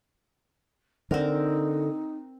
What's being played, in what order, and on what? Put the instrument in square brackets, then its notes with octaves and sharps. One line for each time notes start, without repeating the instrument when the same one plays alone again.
[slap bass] D3 [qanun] C4 A#4 [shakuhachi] D#4